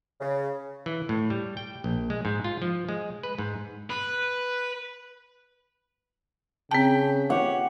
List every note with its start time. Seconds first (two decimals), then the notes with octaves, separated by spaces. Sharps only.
0.21 C#3
0.86 E3
1.09 A2
1.30 G3
1.57 G5
1.84 A#1
2.10 G#3
2.25 G#2
2.44 F4
2.62 F3
2.89 G#3
3.23 B4
3.39 G#2
3.90 B4
6.71 C#3 C4 G5 A5
7.30 G4 C#5 F#5